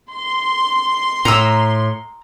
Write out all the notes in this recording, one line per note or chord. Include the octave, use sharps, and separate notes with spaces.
C6
A2 A#5 D#6 E6